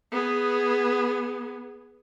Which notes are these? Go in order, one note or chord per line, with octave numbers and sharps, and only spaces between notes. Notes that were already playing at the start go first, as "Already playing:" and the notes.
B3 G#4